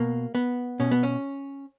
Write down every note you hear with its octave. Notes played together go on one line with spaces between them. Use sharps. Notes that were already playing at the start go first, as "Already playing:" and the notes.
Already playing: B2 A#3
B3
B2 C#4
B3
C#4